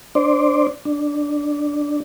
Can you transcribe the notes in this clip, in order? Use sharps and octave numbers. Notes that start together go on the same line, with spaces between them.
D4 C5 D5
D4